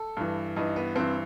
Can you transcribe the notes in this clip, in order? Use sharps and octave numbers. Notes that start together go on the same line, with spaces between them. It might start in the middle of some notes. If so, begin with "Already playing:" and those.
Already playing: A4
G2 E3
G2 E3 D#4 D#5
B3 B4
G2 E3 C4 C5